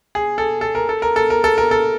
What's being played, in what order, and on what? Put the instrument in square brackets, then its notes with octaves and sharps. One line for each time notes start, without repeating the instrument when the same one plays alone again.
[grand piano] G#4
A4
A4
A#4
A4
A#4
A4
A#4
A4
A#4
A4